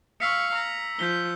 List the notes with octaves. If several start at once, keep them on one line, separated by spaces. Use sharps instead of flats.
F5 C#6 E6 B6 C#7
A#5
F3 G6 B6 G7